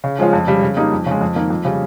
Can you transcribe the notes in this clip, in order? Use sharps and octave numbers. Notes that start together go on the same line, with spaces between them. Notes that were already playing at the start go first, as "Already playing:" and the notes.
C#3
F3 G#3 C#4 F4
F2
C#3 G3
C#3
G3 A#3 D#4
F2
C#3 G#3
F2
D#3 A#3
F2
C#3 G3 C#4